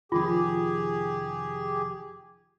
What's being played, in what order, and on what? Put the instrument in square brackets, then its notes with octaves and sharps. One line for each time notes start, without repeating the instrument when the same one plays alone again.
[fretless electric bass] F1 D#3 F3 [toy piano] F4 [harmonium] G4 G#4